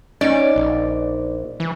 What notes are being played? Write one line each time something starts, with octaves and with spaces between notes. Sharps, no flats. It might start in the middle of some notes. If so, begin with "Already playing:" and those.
C#4 D#4 D5
A#1
E3